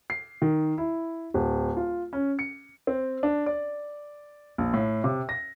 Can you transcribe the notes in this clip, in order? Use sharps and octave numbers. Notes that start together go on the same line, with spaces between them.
C7
D#3
E4
D1
F4
C#4
C#7
C4
D4
D5
A#1
A2
C3
A#6